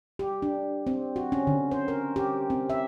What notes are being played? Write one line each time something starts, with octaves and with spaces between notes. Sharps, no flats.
G4
D4
C4
F#4
C#4
D3
C5
A#4
G4
C4
E5